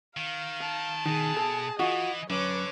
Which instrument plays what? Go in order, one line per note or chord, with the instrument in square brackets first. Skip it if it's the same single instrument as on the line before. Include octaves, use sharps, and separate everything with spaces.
[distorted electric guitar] D#3 [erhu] F5
[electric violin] A5
[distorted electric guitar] B2 [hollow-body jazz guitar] D#3 [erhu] G#4
[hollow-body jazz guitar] A4
[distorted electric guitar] E3 [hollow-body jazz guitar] F4 F#4 [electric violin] D#5
[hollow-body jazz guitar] F#2 [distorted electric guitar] D3 [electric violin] B4 D6 [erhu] C#5